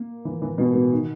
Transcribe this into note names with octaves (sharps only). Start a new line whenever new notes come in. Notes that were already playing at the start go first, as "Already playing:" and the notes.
Already playing: A#3
E3
E3
B2
B2
D#3